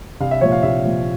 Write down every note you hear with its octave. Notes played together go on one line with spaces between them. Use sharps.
C2 F5
E5
A#2 F3 C#5
F5
C2 E5
A#2 F3